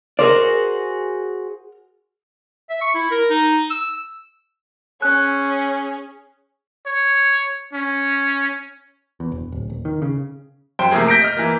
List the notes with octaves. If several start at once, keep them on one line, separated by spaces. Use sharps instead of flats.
F#4 G#4 A#4 C5 D5
E5
C#6
E4
A#4
D#4
E6
C#4 G#4 F#6
C#5
C#4
E2
E1
D1
D#1
D#3
C#3
F#2 C5 G5
C3 F3 A3 A#3 G#4
G6 A#6 B6 D7
D#5 F6
E3 A#3